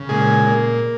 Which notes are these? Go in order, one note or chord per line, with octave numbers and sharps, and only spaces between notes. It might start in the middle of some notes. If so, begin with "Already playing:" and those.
Already playing: C#3
A#2 G#3 G#4
A#3